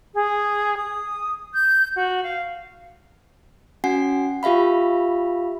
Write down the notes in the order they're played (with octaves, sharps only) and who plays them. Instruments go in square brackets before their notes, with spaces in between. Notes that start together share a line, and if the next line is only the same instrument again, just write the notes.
[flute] G#4
D#6
G6
F#4
F5
[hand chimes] C#4 F#4 F#5 G#5 C7
F4 G4 E5 F5 B5